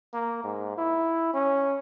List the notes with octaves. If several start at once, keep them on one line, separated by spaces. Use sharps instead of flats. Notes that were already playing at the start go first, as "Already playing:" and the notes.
A#3
G#2
E4
C#4